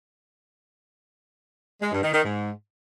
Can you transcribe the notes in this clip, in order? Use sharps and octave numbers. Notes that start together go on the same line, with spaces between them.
G#3
G2
D#3
D#3
G#2